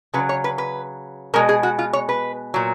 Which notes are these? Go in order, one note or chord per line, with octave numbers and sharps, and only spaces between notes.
C#3 F#3 B4
C#5
B4
B4
B2 G#3 A#4
G#4
F#4
F4
C#5
B4
A#2 F#3